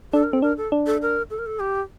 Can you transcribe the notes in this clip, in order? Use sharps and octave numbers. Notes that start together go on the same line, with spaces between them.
D4 A4
A#4
C4 A4
D4 A#4
A4
D4
A4
A#4
A4
A#4
A4
G4